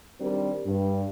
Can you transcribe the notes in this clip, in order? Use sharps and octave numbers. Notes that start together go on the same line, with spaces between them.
D#3 G3 C4 D4 A#4 C5
G2